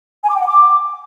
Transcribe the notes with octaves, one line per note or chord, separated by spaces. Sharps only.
G#5
D6
G5
F#5
D6